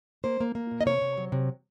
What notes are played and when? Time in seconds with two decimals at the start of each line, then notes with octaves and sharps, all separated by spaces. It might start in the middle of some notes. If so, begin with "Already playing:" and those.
0.24 A#3 C5
0.40 A#3
0.55 A#3
0.71 A#2
0.81 D#5
0.86 C3 C#5
1.01 C3
1.17 F#3
1.32 C3